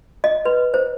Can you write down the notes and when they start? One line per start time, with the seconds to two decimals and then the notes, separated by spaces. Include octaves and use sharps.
0.24 D#5
0.45 B4
0.74 C5